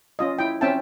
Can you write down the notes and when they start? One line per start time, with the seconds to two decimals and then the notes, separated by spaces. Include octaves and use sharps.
0.19 C#4 F4 D#5
0.39 E4 G5
0.61 C4 C#4 E5 G5 A5